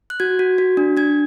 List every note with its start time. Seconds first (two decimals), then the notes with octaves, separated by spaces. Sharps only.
0.10 F#6
0.20 F#4 G#6
0.39 F#4
0.58 F#4
0.77 D4
0.97 D4 G#6